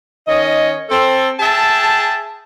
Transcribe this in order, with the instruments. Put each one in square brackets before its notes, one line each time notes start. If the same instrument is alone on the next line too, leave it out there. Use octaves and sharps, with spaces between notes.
[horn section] D#3 C#4 D#5
C4 A4
G#4 E5 G5 A5